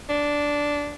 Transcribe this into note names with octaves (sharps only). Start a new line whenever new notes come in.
D4